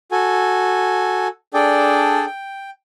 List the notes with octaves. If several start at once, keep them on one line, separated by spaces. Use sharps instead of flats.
F#4 A4 G#5
D4 G#4 A4 D5 G5
G5